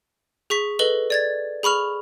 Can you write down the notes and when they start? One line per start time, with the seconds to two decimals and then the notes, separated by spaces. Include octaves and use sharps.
0.50 G#4 C#6 B6
0.79 A4 B4 D#5 F#7 G7
1.10 D5 G#6 A6
1.63 G#4 B5 C#6 F6 F7